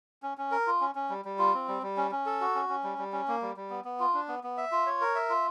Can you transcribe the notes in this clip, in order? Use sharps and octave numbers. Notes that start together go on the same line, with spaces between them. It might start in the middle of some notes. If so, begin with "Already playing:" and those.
C#4
C#4
A#4
F4
C#4
C#4
G3
G3
F4
C4
G3
G3
C#4
C#4
A4
F#4
C#4
C#4
G3
G3
C#4
A#3
G3
G3
B3
B3
F4
D4
B3
B3
E5
F4
C#5
A#4
E5
F4